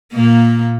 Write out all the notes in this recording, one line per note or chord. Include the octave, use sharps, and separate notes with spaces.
A#2 A#3